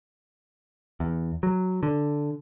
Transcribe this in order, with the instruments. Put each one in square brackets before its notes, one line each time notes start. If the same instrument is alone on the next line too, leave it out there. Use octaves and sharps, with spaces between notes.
[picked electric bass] E2
F#3
D3